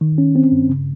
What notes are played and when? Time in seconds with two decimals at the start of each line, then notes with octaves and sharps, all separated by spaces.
0.01 D#3
0.18 C#4
0.36 C4
0.52 G2
0.69 C#3